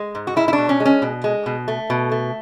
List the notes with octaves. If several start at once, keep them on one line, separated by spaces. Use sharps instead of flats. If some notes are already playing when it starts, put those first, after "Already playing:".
Already playing: G#3
G#2
F#4
G#3 E4
E4
D4
B2
C#4
G#3
C#4
B2
G#3
B2
A3
B2
A3